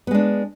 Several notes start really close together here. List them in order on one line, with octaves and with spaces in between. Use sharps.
B3 G#3 D4